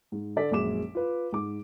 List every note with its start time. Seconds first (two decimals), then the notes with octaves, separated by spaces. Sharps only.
0.12 G#2
0.36 D3 A4 D5 B6
0.51 A#1 F#2 G#3 D6 E7
0.95 F4 B4
1.32 G#2 D6